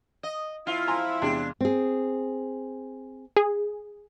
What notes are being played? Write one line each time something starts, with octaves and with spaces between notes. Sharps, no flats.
D#5
F3 C4 E4 F4
G#5 A#5 C6
E2 C3 G#3 D4
C4 G#4
G#4